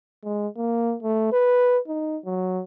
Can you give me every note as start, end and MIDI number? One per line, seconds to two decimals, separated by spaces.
0.24 0.47 56
0.57 0.95 58
1.03 1.28 57
1.32 1.78 71
1.87 2.17 63
2.25 2.62 54